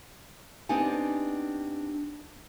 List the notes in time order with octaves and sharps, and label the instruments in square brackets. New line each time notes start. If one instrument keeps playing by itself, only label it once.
[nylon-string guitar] B3 C4 D4 D#4 G4 G#5